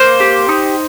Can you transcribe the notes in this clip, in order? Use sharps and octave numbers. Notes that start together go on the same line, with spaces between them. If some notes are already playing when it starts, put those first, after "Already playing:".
Already playing: A#3 C5
G4
D#4